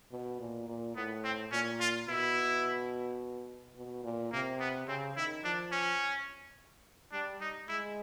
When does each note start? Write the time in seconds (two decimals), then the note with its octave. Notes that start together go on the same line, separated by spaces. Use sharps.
0.12 B2
0.40 A#2
0.68 A#2
0.96 A2 B3
1.24 C4
1.52 A#2 C#4
1.80 F4
2.08 B2 E4
3.76 B2
4.04 A#2
4.32 C3 A#3
4.60 B3
4.88 C#3 C4
5.16 D#3 E4
5.44 F3 D4
5.72 C#4
7.12 G3 D4
7.41 D#4
7.68 G#3 E4